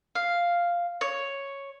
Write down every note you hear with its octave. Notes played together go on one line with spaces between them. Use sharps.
F5
C#5